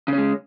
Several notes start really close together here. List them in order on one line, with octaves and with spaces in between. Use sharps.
C#3 C#4 G#3